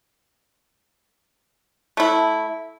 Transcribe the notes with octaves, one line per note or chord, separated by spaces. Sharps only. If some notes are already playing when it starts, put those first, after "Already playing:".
A3 E4